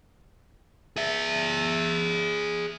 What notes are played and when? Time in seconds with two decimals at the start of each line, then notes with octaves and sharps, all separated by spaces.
0.96 G#4 E5